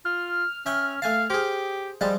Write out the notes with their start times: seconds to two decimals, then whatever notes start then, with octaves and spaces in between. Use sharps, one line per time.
0.05 F4 F6
0.66 C#4 E5 G5 C#6
1.02 A3 F5 G#5 A5
1.30 G4 G#4 C5
2.01 F3 G3 G#3 A5